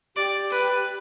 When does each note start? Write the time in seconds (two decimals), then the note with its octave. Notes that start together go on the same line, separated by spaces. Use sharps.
0.16 G4 D5
0.51 B4